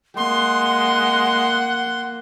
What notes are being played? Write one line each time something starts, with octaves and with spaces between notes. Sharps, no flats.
G#3 A#3 F#5 C6